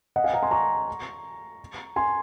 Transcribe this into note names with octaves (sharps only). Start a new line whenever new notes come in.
D#5 F#5
F5 G#5
F#5 A#5
G#5 C6
A#5 C#6
G#5 C6